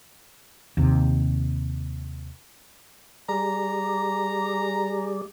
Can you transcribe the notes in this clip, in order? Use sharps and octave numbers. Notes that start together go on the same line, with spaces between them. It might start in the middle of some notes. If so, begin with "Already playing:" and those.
D#2 C3
G3 G#4 D5 A#5